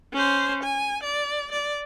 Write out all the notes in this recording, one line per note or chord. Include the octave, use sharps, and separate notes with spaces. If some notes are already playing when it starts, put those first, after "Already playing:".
C#4 C5
G#5
D5
D5